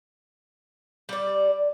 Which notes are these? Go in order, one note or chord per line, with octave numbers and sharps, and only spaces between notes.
G3 D5